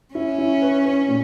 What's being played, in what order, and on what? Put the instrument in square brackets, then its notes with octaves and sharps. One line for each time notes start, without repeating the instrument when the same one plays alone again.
[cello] C#4 [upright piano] E4
[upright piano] E4
B4
B4
A#2